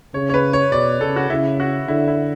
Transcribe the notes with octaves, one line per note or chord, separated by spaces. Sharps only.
C#3 C#5
C#5
B4
C#5
B2 D5
C#3 A4
F#4
C#3 E4
F#4
D3 E4
E4